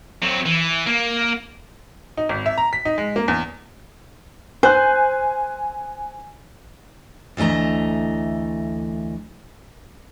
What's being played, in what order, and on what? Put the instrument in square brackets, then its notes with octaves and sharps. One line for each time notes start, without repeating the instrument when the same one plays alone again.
[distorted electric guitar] F#3 C4
E3
A#3
[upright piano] D#4
G#1
E5
A#5
B6
D#4
G#3
A#3
E2
[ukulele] C5 [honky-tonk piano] G#5 F#6
[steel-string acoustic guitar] D2 E3 A3 D#5 A#5